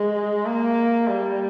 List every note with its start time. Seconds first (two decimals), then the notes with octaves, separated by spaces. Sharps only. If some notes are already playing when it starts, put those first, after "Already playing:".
Already playing: G#3
0.45 A#3
1.07 G3